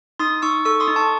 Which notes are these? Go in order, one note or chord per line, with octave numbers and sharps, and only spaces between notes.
D#4 C6 D#6
D#4 C#6 E6
A4 C#6 E6
C6 D#6
D#4
A5 C#6